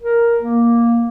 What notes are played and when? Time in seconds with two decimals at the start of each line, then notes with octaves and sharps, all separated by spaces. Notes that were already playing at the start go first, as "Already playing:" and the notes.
0.02 A#4
0.40 A#3